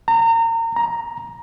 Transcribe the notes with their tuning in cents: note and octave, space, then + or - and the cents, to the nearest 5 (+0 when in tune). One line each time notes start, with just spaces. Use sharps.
A#5 -30
A#5 +10